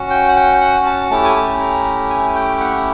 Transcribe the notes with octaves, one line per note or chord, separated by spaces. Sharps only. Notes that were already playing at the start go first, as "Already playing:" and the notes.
Already playing: C#4 F#4
G5
F#5
G5
F#5
A5
A3 C#4 E4 G4 A5
G#5
A5
A#5
G#5
G5
F#5